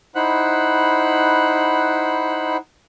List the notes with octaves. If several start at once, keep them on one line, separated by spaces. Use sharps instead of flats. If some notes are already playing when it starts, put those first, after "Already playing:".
D#4 E4 C5 F#5 B5 F#6